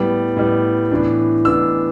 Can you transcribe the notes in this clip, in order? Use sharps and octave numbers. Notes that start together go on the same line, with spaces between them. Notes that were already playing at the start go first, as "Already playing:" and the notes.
Already playing: A2 G3 B3
A2 G3 B3
A2 E3 B3 D4
A2 E3 B3 D4 E6